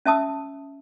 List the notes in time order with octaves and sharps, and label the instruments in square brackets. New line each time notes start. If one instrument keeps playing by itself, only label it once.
[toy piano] C#4 E5 A5 D#6 E6